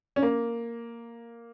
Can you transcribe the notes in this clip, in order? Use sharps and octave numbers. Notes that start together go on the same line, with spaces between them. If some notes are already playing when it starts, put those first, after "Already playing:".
C#4
A#3